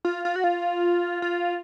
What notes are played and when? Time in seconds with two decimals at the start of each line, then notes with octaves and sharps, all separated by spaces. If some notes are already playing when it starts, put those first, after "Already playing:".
0.05 F4
0.25 F4
0.36 F#4
0.44 F4
1.22 F4